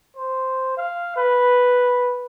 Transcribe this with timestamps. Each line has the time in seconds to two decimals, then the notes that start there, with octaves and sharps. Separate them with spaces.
0.16 C5
0.77 F5
1.16 B4